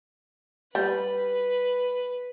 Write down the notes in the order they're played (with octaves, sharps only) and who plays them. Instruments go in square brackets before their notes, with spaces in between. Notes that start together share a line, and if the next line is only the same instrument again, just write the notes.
[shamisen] G3 [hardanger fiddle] B4